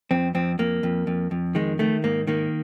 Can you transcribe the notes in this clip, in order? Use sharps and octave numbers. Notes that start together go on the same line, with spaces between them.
F2 C4
F2 C4
F2 A#3
F2
F2
F2
D#3 G#3
D#3 A3
G#2 A#3
D#3 A#3